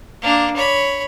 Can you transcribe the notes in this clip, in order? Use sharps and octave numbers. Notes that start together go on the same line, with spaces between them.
A#3 D4
C#5 B5